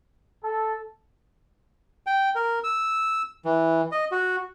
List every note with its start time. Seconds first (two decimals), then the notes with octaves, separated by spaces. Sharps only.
0.44 A4
2.07 G5
2.35 A#4
2.64 E6
3.45 E3
3.92 D#5
4.12 F#4